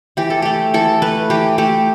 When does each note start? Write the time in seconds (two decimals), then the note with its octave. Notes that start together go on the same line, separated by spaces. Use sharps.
0.17 E3 G4
0.30 A4
0.42 A3 G4
0.74 E3 A4
1.02 A3 B4
1.30 E3 G4
1.58 A3 G4